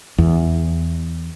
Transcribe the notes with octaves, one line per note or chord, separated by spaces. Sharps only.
E2